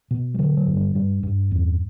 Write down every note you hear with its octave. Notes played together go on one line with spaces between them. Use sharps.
B2
G3
D3 F#3
F#3
G2
G3
G2 G3
G2
E2